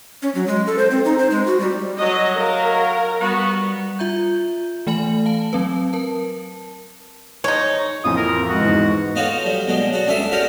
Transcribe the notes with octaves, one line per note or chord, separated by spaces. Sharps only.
C#4
F#3
G#3
A4
C5
C4
D#4
C5
G#3
F#4
G3
F#3 D#5
A#4 F5
G3 B3 F#4
F4 E5 A#5 G6
E3 A3 G#5 B5 F#7
F5 A5
F#3 C4 B4
A#4 A5
G#3 D#4 C#5
A1 F2 G#5 D#6
A#4
G#3 F#4
E2 G#2
B3 D#4 F4 F#4 A4 C#5
F#3 G3
B2 F#3 G#3 D4
F#4 A4
C#2 C#4 D4 A4 E5 D#6
C#4 F#4 G4 A#4 D5